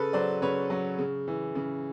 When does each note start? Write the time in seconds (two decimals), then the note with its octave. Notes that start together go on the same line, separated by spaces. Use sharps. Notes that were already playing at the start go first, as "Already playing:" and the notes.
Already playing: C#3 A4 B4
0.13 F#3 C5 D5
0.42 C#3 B4 C#5
0.70 F#3
0.98 C#3
1.28 E3
1.55 C#3